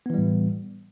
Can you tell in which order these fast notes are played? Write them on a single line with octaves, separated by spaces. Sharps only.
B3 E3 G3 A2